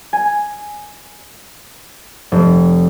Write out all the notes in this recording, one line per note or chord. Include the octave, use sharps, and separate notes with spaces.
G#5
F1